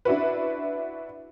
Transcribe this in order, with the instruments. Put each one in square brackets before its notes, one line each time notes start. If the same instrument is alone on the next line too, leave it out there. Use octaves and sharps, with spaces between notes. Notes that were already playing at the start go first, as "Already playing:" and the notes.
[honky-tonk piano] D4 E4 F#4 B4